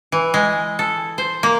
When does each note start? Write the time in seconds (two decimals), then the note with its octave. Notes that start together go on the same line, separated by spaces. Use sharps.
0.12 E3
0.34 G#3
0.79 A4
1.18 C5
1.43 A#3